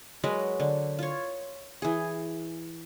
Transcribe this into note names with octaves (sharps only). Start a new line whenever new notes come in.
F#3 G#3 A#4 B4
D3
F4 C#5
E3 G#4